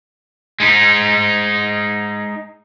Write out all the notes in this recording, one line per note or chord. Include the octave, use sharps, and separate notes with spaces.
G#3 D#4